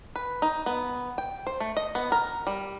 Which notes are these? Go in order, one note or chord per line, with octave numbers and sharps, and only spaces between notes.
B4
D#4
B3
G5
C5
A3
D#5
B3
A#4
G3